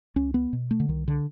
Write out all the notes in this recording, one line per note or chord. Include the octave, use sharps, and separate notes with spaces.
C#2 C#4
B3
B2
A3
D3
C2 D#3
D3